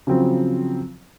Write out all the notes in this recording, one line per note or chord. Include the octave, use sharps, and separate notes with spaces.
C#3 F3 F#3 C4